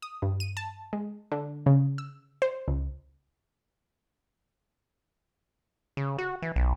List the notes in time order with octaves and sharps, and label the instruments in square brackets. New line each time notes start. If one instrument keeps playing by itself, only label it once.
[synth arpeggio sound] D#6
G2
D#7
A5
G#3
D3
C#3
E6
C5
C#2
[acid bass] C#3
F#4
E3
B1